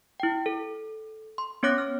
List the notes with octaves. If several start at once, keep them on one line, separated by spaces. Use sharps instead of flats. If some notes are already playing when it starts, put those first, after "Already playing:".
E4 G5
A4
C6
B3 C#4 C#5 D6 F#6 A#6
F6